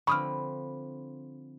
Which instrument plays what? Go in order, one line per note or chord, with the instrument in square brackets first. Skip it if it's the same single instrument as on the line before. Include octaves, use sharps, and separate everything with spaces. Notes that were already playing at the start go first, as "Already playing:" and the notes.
[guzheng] D3 F3 C4 [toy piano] B5 [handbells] C#6 D#6 F6